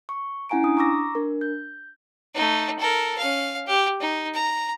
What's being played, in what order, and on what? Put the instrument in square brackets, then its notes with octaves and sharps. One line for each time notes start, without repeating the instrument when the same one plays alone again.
[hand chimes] C#6
C#4 E4 F#5 G#5 A#5 D7
D4 D#6
A#5 C#6 D6 E6 A#6
D4 A#4
G6
[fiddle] A3 D#4
A4 A#4
C#4 F5
G4
D#4
A#5